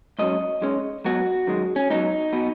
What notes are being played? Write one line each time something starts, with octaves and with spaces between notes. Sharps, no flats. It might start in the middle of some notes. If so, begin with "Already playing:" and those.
G#2 F#3 C#4 D#5
G#2 G#3 C#4
G#2 F#3 B3 F#4
F#2 D#3 G#3
C#4
G#2 F#3 B3 D#4
B2 B3